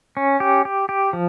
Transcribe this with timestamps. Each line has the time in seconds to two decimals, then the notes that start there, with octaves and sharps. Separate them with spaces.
0.17 C#4
0.40 G4
0.65 G4
0.89 G4
1.13 F3